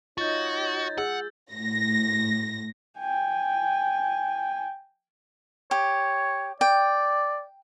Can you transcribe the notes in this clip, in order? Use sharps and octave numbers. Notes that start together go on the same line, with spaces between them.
D#4 F4 F#4 C#5 D#5 G6 A6
G#4 F#5 E6
A2 A#6
G5 G#5
G4 C#5
D5 G5